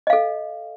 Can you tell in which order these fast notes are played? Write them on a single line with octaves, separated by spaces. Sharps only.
D#5 F5 A4